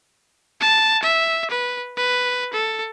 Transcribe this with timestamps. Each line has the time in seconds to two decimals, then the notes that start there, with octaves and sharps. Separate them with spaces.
0.61 A5
1.03 E5
1.51 B4
1.97 B4
2.53 A4